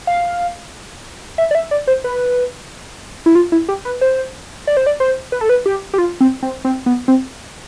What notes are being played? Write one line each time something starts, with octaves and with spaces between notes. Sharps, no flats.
F5
E5
D5
E5
D5
C5
B4
E4
F4
E4
G4
B4
C5
D5
C5
D5
C5
B4
A4
B4
G4
G4
F4
C4
C4
C4
B3
C4